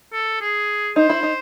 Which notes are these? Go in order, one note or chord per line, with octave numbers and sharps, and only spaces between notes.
A4
G#4
D#4 C5
E4
D#4